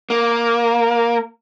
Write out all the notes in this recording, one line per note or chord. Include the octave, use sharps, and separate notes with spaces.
A#3